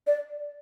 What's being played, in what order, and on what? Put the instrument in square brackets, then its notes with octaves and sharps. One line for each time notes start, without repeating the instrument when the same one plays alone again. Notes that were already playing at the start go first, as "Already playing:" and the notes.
[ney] D5